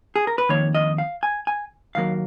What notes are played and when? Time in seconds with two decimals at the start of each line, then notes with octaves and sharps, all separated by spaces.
0.16 G#4
0.27 A#4
0.38 B4
0.49 F2 D#3 A#3 C#5
0.75 D#5
0.98 F5
1.23 G#5
1.47 G#5
1.95 D#2 D#3 F#3 A#3 F5